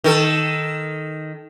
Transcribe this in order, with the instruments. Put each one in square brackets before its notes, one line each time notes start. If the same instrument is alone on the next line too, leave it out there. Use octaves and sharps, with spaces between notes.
[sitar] D#3 A4